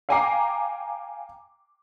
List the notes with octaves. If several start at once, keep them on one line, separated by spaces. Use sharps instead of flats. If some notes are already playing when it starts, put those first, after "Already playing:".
F5 G5 G#5 A#5 D6 C7